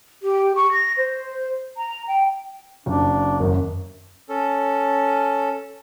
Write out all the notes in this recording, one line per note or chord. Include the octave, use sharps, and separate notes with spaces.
G4
C#6
A#6
C5
A#5
G5
F#1 D4
F#2 D#3
C#4 A4